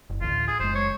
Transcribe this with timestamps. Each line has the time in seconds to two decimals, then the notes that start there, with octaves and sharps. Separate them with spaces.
0.10 F#1
0.21 A1 D2 F4
0.47 G#4
0.59 F#1 G#3 C5
0.75 C#5